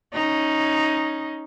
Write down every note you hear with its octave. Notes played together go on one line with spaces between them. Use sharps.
C#4 D#4